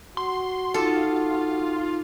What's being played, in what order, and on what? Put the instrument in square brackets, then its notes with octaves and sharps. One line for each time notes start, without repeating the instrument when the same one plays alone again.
[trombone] F#4 [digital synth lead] C6
[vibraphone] D#4 D6 [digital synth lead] F4 [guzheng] A4 A5